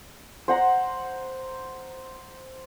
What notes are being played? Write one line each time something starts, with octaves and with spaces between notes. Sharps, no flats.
C5 F#5 A#5